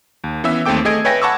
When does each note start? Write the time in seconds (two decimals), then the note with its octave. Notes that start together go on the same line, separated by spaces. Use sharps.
0.24 D#2
0.44 E3 B3 C#4 E5 E6
0.65 D#2 A3 C4 A4 G5 D6
0.85 A3 G#4 D#5 G#6 D7
1.05 B4 C#5 E5 G5 G#5 A#6
1.22 F#5 A5 B5 C#6 D6 E6